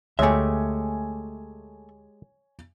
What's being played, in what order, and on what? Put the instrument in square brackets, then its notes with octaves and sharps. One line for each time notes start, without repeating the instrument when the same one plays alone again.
[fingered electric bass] D2 [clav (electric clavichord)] G#3 G4 [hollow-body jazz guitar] A3 E5 [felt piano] C#5 G#5